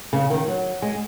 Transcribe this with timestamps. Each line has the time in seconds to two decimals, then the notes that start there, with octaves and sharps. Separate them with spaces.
0.13 C#3
0.30 D#3
0.48 F#3
0.82 G#3